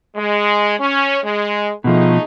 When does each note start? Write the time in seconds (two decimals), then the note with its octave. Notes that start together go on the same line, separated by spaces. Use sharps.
0.15 G#3
0.78 C#4
1.23 G#3
1.84 B2 F3 A3 D#4 G#4